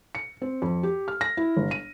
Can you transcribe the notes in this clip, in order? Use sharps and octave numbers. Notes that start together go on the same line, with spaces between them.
C#7
C4
F2
G4
F6
A#6
E4
G1
D#7